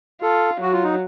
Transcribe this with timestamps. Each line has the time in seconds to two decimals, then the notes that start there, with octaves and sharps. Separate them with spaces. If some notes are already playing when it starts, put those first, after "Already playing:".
0.22 F4 A4
0.61 F#3 F#4
0.72 F4
0.84 D#4